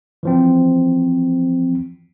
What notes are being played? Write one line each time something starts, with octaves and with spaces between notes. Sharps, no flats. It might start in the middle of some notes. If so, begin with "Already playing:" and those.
E3 F3 C4